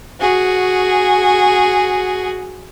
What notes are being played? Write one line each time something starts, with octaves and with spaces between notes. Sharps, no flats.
F#4 G#4